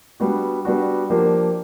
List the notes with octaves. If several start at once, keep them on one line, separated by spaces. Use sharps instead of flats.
G3 B3 D4 F#4
G3 B3 D4 F#4
F3 A#3 D4 G4